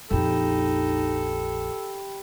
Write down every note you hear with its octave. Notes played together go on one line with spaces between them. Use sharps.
A#1 F2 D#4 G4 A4 G5 B5